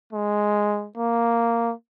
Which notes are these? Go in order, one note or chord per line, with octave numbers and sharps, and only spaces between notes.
G#3
A#3